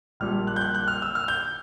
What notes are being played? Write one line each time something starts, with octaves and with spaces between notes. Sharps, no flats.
A#1 A#2 G3 F6
F#6
G6
F#6
F#6
F6
E6
F6
G6